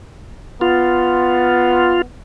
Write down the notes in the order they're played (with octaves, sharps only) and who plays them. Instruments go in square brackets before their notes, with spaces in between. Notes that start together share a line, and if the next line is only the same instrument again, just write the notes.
[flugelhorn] B3 [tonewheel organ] F4